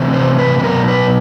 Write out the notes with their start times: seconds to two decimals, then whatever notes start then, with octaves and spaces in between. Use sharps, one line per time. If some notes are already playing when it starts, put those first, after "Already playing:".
Already playing: C3 E3 A3 C4
0.13 C5
0.38 B4
0.59 B4
0.63 B2 F#3 B3 A#4
0.88 B4